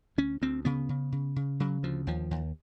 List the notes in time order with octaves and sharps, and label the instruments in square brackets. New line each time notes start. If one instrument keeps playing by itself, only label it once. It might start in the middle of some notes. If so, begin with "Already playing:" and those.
[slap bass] D2 C#4
D2 C4
C#3 B3
C#3
C#3
C#3
C#3 F#3
D2 F3
D#2 F3
D#2